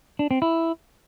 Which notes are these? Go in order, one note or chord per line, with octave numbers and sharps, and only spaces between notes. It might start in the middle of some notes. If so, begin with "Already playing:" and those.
D4
C4
E4